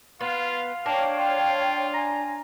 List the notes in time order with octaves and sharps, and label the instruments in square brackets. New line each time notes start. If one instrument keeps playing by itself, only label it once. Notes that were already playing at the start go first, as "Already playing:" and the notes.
[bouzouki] B3 [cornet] F4 [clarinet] F5
[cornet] A#3 [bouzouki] D4 [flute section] C#5 G5
[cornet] F4
[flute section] G#5 [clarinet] A#5